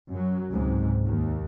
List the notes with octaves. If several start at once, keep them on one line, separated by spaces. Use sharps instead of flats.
F#2 F#3
C#2 G#2 C3
D#2